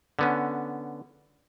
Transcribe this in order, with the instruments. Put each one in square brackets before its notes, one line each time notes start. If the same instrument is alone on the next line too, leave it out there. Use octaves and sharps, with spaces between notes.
[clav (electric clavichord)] D3 B3 C#4